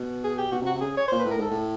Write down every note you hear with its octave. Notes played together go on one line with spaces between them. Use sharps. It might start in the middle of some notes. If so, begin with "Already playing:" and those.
Already playing: B2
G#4
G4
B2 F#4
C3
F#4
C3
C#3 G#4
C#5
A#2 C5
B4
A2
A#4
G#2 A4
A2